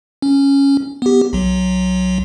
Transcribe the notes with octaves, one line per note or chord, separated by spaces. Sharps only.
C#4
B3 G4
B1 F#3